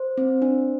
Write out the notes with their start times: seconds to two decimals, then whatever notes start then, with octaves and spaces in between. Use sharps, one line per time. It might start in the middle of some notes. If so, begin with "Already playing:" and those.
Already playing: C5
0.18 C4
0.42 D4